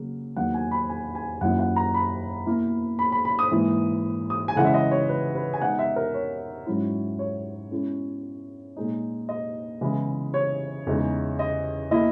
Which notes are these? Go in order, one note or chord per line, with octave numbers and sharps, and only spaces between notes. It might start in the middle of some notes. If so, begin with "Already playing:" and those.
Already playing: C#3 F#3 A#3
E2 D#3 F#3 A#3 F#5
G#5
B5
G#5
G#5
F#2 D#3 F#3 A#3 E4 F#5
F#5
A#5
B5
B2 A#3 E4
B5
B5
B5
D#6
G#2 E3 A#3
D#6
G#5
C#3 E3 G#3 C#4 F#5
E5
D#5
C#5
B4
B4
G#5
B2 G#3 D#4 F#5
E5
A#4
C#5
G#2 F#3 C#4 E4
C#5
B2 G#3 C#4 E4
A#2 G#3 D#4
D#5
C#3 E3 G#3 B3 E4
C#5
E2 C#3 G#3 D#4
D#5
B2 A#3 E4 D#5